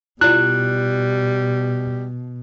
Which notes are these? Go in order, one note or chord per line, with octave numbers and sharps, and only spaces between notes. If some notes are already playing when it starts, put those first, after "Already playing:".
B2 G3 E4 F4 D5 F#6